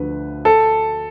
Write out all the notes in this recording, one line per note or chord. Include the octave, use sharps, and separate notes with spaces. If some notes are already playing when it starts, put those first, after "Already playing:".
Already playing: D2 D3 F3 B4
A4